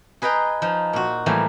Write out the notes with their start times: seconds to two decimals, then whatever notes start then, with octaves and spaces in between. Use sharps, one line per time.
0.22 G#4 B4 D#5 G5 A#5
0.62 F3 D#4
0.93 A#2 F#4
1.26 A2 E3 F3 G3 A#3